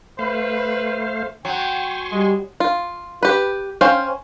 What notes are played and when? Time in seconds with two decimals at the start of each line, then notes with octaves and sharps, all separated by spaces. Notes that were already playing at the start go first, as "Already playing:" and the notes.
0.19 A3 B4 C5 F5
1.45 F#3 G5 G#5 C6 C#6
2.12 G3 G#3
2.60 F4
3.23 G4 B4
3.81 C#4 C5 F5 G5